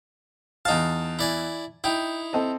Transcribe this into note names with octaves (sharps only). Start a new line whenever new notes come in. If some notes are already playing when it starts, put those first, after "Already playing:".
E2 D#4 D#5 F5 A5
E4 D5 G#5
D#4 E4 G5
C4 A4 D#5